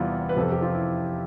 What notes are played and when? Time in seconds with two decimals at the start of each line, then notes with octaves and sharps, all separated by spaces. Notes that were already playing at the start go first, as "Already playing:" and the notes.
Already playing: E2 C3 G3 B3 E4 F4
0.29 B4
0.36 F2 C3 F3 A4
0.51 G4
0.62 F4
0.74 E4